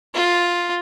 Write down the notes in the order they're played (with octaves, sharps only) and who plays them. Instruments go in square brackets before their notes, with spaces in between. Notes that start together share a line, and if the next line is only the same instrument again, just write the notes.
[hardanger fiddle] F4